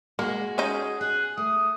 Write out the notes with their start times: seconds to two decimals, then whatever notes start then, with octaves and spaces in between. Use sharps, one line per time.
0.19 G#3 A#3 F#4
0.58 C#4 D#4 G#4
1.01 G#4 F#6
1.38 A3 D#6